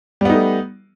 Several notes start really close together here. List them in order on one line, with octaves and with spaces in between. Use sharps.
G3 B3 D#4 A3